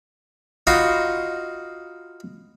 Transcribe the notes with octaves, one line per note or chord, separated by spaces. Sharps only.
D#4 F4 F#4 B5 C6